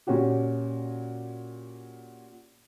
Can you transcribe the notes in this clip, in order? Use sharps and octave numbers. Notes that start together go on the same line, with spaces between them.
A#2 C#4 F#4 G4